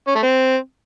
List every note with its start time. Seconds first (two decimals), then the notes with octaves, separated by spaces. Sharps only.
0.08 C#4
0.15 A3
0.23 C4